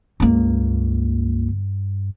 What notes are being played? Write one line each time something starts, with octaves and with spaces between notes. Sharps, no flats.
C#2 G2 A#3